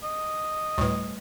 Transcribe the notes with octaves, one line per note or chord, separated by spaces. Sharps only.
D#5
D2 A2 G3 A3 B4